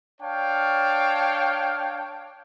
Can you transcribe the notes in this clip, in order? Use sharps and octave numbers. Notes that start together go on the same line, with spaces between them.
D4 C#5 F5 G5 A5